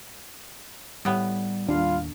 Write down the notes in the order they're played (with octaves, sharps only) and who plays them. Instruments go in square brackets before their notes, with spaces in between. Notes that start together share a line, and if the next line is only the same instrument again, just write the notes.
[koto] A2 B3 [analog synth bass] G3
[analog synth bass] D#2 [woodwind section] G3 F4 F5 [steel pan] D4